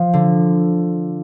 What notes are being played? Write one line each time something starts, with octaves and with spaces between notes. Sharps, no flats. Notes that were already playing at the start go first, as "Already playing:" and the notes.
Already playing: F3
D3